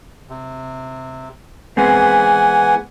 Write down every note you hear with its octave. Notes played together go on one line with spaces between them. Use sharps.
C3
E3 G#3 B3 C4 F#5 G#5